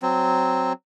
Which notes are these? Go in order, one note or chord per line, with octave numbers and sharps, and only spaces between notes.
F#3 C4